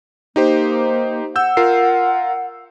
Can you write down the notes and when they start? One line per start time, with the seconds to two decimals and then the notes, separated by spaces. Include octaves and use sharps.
0.36 A#3 D#4 G4 C5
1.36 F#5 E6 G6
1.57 F4 A#4 C7